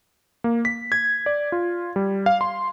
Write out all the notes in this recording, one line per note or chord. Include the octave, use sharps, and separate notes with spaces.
A#3
B6
G#6
D5
F4
G3
F5
C6